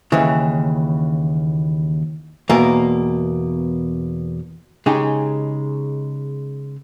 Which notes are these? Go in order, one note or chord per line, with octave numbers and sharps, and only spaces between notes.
D#2 C#3 E3
E2 B2 A#3
C#3 G#3 D#4 G4